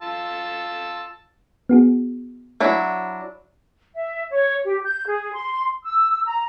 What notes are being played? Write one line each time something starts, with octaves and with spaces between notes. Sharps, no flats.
F4 A5 E6
B3 F#4 G#4
F#3 D4 E4
E5
C#5
G4
G6
G#4
C6
E6
A#5